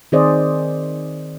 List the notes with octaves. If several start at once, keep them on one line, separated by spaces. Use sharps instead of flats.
D#3 C4 G#4 C5 D5 D#5